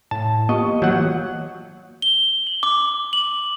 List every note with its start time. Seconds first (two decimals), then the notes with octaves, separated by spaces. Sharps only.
0.11 A2 A5
0.49 A#3 B3 F4 G4 D#5 C#6
0.82 E3 F#3 F#5 G6
2.02 G7
2.47 F#7
2.63 D6
3.13 F#7